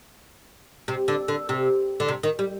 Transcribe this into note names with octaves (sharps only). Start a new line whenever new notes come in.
C3
D3
D3
C3
D3
C3
D#3
G3